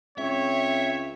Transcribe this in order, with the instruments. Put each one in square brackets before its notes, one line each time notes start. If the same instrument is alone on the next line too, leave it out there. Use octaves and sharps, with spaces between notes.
[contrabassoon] C#2 [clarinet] C4 [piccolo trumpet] C#5 [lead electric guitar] E5